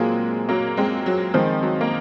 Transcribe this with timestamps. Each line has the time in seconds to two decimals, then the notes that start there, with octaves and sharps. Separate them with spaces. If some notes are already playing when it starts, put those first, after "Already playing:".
Already playing: A#2 F#3 G#3 A#3 C4 F4 G#4
0.49 F#3 A#3
0.77 G#3 C4
1.06 F#3
1.34 D#3 F3 G#3 C4
1.63 F#3
1.81 A#3